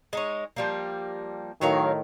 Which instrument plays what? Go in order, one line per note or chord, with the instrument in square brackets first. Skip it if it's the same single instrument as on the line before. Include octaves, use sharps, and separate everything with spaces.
[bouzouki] G#3 D#4 C#5
F3 G3 A#3
[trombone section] A2 D#3 [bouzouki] F#3 C#5 F5